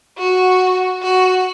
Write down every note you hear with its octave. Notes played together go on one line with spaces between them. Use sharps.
F#4
F#4